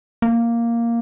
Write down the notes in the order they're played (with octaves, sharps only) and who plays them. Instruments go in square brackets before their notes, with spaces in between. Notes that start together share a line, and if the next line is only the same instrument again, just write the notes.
[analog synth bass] A#3